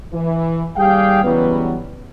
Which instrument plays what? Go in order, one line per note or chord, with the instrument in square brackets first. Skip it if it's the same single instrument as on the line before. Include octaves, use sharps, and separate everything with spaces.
[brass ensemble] E3
D#2 G3 G4 G#4 F5 G5
C#3 E3 F#3 G3 B3